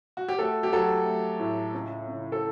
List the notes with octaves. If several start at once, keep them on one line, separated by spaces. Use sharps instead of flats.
F#4
G4
A3 F#4 A4
G4
F#3 F#4 A4
A3
A2
C#2
C#3
A4